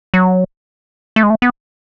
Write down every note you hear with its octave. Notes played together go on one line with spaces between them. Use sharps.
F#3
A3
G#3
A3
B3